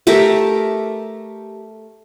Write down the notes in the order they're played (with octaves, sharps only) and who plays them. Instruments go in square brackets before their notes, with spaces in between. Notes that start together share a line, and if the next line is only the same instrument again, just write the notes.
[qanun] A3 G4 A#4 E5